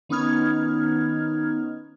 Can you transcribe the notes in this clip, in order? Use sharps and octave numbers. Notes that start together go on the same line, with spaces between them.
D#3 B3 C#4 D#4 F6 G#6